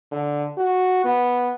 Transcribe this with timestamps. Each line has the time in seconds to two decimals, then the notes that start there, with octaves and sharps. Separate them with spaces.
0.12 D3
0.58 F#4
1.05 B3